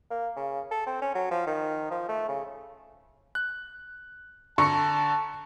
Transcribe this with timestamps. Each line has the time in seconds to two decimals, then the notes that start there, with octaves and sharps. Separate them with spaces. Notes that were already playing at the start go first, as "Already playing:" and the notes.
0.11 A#3
0.37 C#3
0.71 A4
0.87 C4
1.02 C#4
1.15 F#3
1.31 F3
1.47 D#3
1.91 F3
2.09 A3
2.29 C#3
3.35 F#6
4.58 D3 A5 A#5 C#6 C#7